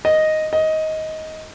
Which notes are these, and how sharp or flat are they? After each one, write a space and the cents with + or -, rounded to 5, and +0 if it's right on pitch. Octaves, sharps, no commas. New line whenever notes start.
D#5 +0
D#5 +15